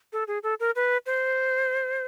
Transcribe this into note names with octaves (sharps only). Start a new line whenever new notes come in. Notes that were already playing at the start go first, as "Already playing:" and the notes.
A4
G#4
A4
A#4
B4
C5